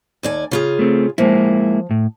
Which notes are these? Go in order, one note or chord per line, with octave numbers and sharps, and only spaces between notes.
D#2 D5 G#5
C#3 F4 G#4
A3 C4
F3 G#3 A#3 E4
A2